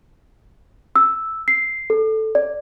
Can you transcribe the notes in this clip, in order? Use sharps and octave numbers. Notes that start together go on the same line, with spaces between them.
E6
C7
A4
D5